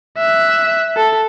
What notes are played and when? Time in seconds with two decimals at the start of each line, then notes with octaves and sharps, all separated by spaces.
0.18 E5 F#6
0.97 A4